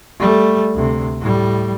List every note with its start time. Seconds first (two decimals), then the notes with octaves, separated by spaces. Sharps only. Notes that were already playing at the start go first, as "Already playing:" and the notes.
0.19 G3 A3
0.74 D2 C3
1.20 A2 G3